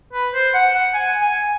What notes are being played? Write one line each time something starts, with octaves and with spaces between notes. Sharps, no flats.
B4
C5
F#5
F#5
G#5
G#5